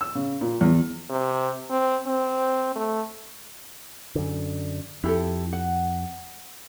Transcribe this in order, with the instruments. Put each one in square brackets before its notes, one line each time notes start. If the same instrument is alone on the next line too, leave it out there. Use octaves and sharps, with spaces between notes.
[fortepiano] E6
C#3
A#2
E2
[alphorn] C3
C4
C4
A3
[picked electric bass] F#2 D3
[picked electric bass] F2 [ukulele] E4 G4 A4
[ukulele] F#5